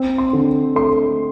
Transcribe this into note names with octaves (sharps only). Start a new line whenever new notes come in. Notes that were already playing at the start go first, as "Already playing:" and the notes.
Already playing: C4
C6
D3
A3 C6